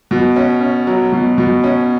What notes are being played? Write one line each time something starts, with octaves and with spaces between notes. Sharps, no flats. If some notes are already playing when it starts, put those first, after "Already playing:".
B2
C#4
C#4
F#3
B2
B2
C#4